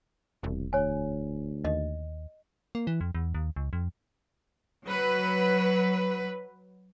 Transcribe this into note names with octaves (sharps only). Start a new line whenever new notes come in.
E1 C2
D2 C#5 G#5
D#2 D#5
A#3
E3
F2
E2
D#2
C#2
F2
F#3 B4